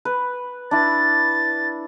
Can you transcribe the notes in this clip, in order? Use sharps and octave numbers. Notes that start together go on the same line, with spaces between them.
B4
D4 E4 A6